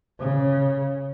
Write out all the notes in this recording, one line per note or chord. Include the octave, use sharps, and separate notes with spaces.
C#3